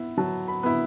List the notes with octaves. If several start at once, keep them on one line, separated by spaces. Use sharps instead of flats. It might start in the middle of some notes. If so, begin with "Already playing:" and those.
Already playing: B3 E4
F#3 A5
B5
B3 E4